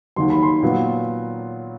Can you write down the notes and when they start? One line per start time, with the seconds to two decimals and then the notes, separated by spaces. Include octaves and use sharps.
0.16 D#2 D#3 F#3 C6
0.30 B5
0.43 C6
0.63 A#2 F#3 B3